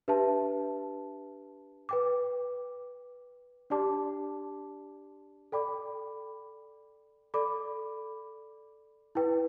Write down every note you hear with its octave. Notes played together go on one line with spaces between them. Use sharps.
D4 G4 B4 E5 A5
B4 G5 D6
D4 G4 D5 A5 D6
A4 D5 G5 B5 D6
A4 D5 B5 D6
E4 B4 G5